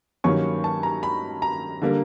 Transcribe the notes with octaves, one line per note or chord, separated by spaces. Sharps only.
G2 D#3 F#3 A#3 C#4 C#6
A5
A#5
B5
A#5
D3 G3 A#3